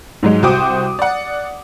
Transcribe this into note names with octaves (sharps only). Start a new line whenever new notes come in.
G#2 F#3 G#3
C2 F#4 C5 G5 D6 D#6
D5 F#5